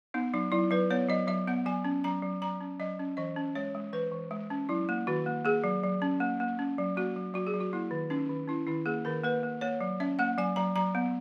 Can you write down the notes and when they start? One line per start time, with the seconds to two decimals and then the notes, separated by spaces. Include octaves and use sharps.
0.14 B3 D#4
0.34 F#3 D#4
0.52 F#3 E4
0.71 F#3 B4
0.90 B3 C#5
1.09 F#3 D#5
1.27 F#3 E5
1.47 B3 F#5
1.66 F#3 G#5
1.85 C#4
2.04 F#3 A#5
2.23 F#3
2.42 F#3 A#5
2.61 C#4
2.80 F#3 D#5
2.99 C#4
3.17 E3 D#5
3.36 C#4
3.55 G#3 C#5
3.74 G#3
3.93 E3 B4
4.12 E3
4.31 G#3
4.50 C#4
4.69 F#3 E4
4.89 A#3
5.07 D#3 F#4
5.26 A#3
5.45 A#3 G#4
5.64 F#3
5.83 F#3
6.02 C#4
6.20 A#3
6.40 A#3
6.59 C#4
6.78 F#3
6.97 A#3 F#4
7.16 F#3
7.34 F#3 F#4
7.47 G#4
7.54 F#3
7.60 F#4
7.73 A#3 E4
7.91 D#3
8.10 C#4 D#4
8.29 D#3
8.48 C#4 E4
8.67 D#3 E4
8.86 A#3 G#4
9.05 D#3 A#4
9.24 A#3 B4
9.43 A#3
9.61 A#3 C#5
9.81 F#3
10.00 C#4 E5
10.19 A#3 F#5
10.38 F#3 G#5
10.56 F#3 A#5
10.76 F#3 A#5
10.95 B3